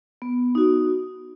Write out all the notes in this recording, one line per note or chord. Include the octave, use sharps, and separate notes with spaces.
B3
D#4 F#4